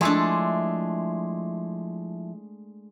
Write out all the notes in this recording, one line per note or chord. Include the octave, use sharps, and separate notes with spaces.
F3 G#3 A3 D4 E4 E5